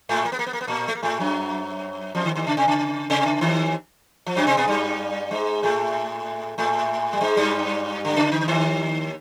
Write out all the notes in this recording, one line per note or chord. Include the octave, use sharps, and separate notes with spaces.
A2 A3
A#3
B3
A#3
B3
A#3
B3
A#2 A#3
A3
A#3
A2 A3
F#2 F#3
F2 F3
D#2 D#3
D#2 D#3
C#3
C3
C#3
C3
C#3
D#2 D#3
F3
F#2 F#3
C3 C4
B2 B3
G2 G3
G#2 G#3
A2 A3
A2 A3
G3
G#2 G#3
G2 G3
D3
C#3
D3
D#2 D#3